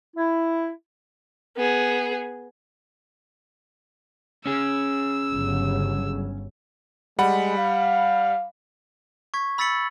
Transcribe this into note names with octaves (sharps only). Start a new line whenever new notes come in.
E4
B3 G#4
C#4 G#4 E6
G1 C#3 F#3
G3 G#3 F#5 B5
F5
C#6 G#6 B6
B5 E6 A6 B6 C#7 F#7